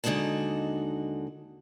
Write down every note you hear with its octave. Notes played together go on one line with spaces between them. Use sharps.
D#2 D3 G#3 D#4 F#4 A5